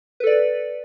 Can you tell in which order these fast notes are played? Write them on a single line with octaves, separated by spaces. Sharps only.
B4 A4 D5